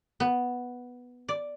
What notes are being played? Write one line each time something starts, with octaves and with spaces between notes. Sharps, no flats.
B3
D5